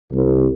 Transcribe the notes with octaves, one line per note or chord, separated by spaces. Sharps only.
C2